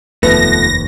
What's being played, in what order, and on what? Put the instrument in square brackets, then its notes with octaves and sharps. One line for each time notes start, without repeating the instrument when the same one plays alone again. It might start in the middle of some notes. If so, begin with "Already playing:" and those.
[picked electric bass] F1 D#2 [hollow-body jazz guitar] B2 F3 A3 [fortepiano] B4 [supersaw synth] A#6